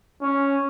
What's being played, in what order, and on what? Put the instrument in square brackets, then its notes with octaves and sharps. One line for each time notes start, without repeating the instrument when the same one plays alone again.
[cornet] C#4